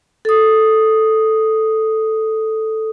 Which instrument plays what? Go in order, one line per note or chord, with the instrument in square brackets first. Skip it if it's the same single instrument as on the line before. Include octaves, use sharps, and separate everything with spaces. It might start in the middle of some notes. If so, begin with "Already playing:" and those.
[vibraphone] A4 D#6